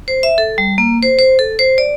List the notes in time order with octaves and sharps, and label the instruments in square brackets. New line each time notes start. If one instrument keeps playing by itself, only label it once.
[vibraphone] C5
E5
A4
G3
A#3
C5
C5
A4
C5
D5